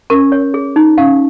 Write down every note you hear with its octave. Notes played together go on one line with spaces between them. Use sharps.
C#4 A#4
C#5
G#4
D#4
C#4 F5